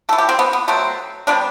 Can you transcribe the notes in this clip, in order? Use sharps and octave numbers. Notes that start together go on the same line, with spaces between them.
E3 A3 A4
G4
C4
B3
B3
B2 F#3 A3 C4
C3 G3 B3 D4